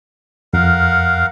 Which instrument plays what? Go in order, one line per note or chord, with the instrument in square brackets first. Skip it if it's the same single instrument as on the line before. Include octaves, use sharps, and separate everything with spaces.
[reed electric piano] F2 [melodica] A#4 F5 F#5